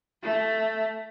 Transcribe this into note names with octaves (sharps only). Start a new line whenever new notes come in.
A3